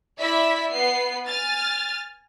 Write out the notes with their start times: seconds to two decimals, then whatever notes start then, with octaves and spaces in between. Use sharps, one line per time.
0.20 E4 D5 E5 B6
0.72 B3 C7
1.28 G#5 F6 A6